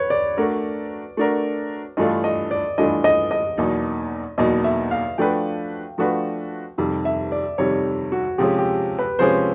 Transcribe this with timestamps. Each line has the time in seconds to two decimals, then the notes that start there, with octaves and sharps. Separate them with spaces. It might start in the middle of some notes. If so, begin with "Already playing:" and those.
Already playing: B4 C#5
0.10 D5
0.37 A3 D4 F#4 A#4
1.17 A3 D4 F#4 A#4
1.97 G2 E3 A3 D4 F4 D#5
2.24 D#5
2.51 D5
2.78 G2 E3 A3 D4 F4 D#5
3.04 D#5
3.31 D#5
3.57 E2 B2 F#3 A#3 D#4
4.38 E2 B2 F#3 A#3 D#4 D#5
4.64 E5
4.91 F5
5.18 F3 A3 D4 F#4 B4 G5
5.98 F3 A3 D4 F#4 B4
6.78 F2 C3 D#3 G3
7.05 E5
7.32 D5
7.58 F2 C3 D#3 G3 C#5
8.12 F#4
8.38 C3 F3 G#3 C#4 G4
8.59 G4
8.99 B4
9.19 C3 F3 G#3 C#4 C5